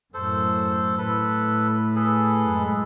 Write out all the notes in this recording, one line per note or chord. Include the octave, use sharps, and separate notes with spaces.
F#2 A2 A4 C5
A2 A4 B4
G#4 A4 B4
F#2 G#3